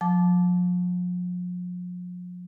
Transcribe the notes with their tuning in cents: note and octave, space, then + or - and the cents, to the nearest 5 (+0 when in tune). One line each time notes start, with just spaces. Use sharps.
F3 +40 A5 -20 D6 +0